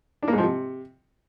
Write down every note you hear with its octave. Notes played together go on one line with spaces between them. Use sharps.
D4
A#3
G#2
F3
C3